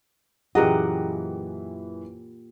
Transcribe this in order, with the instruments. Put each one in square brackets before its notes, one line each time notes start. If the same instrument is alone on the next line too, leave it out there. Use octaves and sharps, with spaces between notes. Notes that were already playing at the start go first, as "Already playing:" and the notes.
[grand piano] F#2 E3 [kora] A#2 A#4 D#5 [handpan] G4 F#5 [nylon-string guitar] G#4